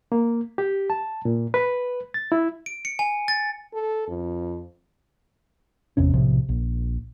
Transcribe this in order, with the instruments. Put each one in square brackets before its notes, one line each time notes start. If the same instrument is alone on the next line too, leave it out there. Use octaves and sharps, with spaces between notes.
[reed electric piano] A#3
G4
A5
A#2
B4
A6
E4
[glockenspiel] D7
C#7
G#5
A6
[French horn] A4
F2
[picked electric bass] G#1 E2 C3 C#4
B1 A2 C3 F3
A#1